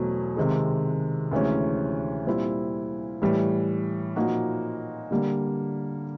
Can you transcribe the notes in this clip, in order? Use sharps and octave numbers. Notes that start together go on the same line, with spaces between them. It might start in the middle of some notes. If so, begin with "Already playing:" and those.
Already playing: E2 B2 F#3 A3 C4
C2 C3 D#3 G#3
D2 C3 E3 G#3 C#4
A#2 G3 C4 E4
A2 E3 G3
A#2 F3 A#3 D#4 F#4
D3 G3 A#3